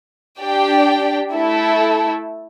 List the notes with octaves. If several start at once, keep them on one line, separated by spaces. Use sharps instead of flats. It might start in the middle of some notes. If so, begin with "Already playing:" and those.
D4 G4 D5 G5
A3 E4 A4